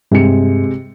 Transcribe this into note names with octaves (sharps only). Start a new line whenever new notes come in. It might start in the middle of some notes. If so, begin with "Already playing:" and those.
G2 C3 G#3 C#7